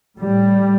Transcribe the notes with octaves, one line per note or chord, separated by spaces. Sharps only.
A2 G3